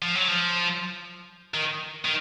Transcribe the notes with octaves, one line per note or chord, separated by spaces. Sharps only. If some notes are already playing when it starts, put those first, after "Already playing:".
F3
F#3
F3
D#3
D#3